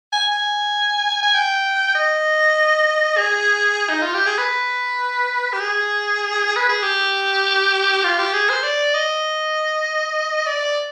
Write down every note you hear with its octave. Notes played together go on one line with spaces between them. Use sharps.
G#5
G#5
G#5
G5
D#5
G#4
D#4
F4
G4
G#4
B4
G4
G#4
B4
G#4
G4
F4
G4
G#4
C5
D5
D#5
D5